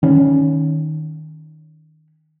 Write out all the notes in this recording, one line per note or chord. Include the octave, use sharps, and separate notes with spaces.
D#3 C#4